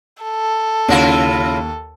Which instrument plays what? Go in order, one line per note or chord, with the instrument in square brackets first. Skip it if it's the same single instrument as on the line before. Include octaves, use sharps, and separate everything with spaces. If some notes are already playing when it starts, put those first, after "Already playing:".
[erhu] A4
[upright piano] D#2 [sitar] C#3 E4 F4